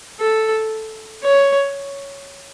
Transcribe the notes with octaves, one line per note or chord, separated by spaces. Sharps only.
A4
C#5